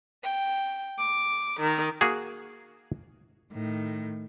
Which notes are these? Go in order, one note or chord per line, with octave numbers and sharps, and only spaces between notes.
G5
D6
D#3
A#3 F#4 G#4
A2 D#3